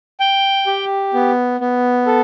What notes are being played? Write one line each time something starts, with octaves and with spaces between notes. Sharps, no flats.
G5
G4
B3
B3
A4